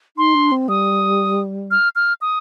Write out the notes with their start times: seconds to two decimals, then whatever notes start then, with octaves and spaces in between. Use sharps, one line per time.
0.17 D#4 C6
0.35 D4
0.52 C4
0.68 G3 D#6
1.71 F6
1.96 F6
2.21 D#6